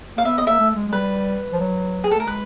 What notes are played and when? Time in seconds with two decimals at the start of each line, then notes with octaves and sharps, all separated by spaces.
0.16 A#3 F5
0.25 B3 E5
0.38 B3 D#5
0.47 A#3 E5
0.59 A3
0.75 G#3
0.88 G#3
0.92 G3 B4
1.53 F3
1.60 F#3
2.04 G#4
2.11 A4
2.16 A3 A#4
2.27 G#3 B4